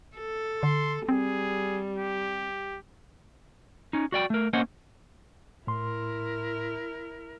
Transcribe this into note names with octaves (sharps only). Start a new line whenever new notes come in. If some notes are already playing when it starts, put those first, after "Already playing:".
A4
D3 C6
G3 C4 G#4
G4
C#4 D#4
F#4 D5 G5
A3 A#4
A#3 C#4 C5 C#5 D#5 F#5
A2 E4 A#4 C6